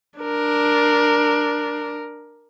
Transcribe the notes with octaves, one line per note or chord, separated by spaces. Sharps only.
D4 A#4